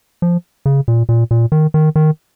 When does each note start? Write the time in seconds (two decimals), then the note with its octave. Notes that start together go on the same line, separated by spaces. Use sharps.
0.22 F3
0.66 C#3
0.88 A#2
1.09 A#2
1.31 A#2
1.52 D#3
1.74 D#3
1.96 D#3